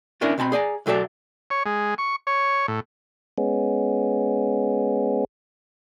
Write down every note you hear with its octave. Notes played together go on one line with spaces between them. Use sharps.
B3 C#4 D4 E4 A#4
B2 C4 A5 B5
G#4 D5 G#5 A#5
B1 F#3 A4 D5 E5
C#5
G#3
C#6
C#5
A2
G#3 B3 C#4